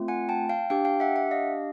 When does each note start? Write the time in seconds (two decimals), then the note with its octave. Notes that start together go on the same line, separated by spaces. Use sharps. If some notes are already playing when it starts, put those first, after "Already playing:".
Already playing: A3 C4 F4
0.08 F#5 G#5
0.29 G5 A5
0.49 F5 G5
0.70 D4 G4 F5 G5
0.85 F5 G5
1.00 E5 F#5
1.16 E5 F#5
1.31 D#5 F5